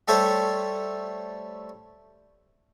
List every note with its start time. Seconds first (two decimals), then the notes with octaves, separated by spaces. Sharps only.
0.08 G3 A3 A4 C5 C#5 E5